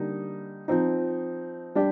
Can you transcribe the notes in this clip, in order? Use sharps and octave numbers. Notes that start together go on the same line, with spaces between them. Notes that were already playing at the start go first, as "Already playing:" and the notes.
Already playing: D3 G3 A#3 D#4
F3 C4 D#4
G3 D4 G4